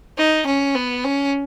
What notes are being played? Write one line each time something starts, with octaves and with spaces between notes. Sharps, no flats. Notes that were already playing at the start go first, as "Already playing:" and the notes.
D#4
C#4
B3
C#4